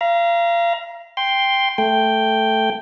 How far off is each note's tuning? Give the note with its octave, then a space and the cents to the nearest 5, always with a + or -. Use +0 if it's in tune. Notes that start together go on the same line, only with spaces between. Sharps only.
F5 -30 A#5 +20
G5 +5 C6 +0
A3 +0 G5 +0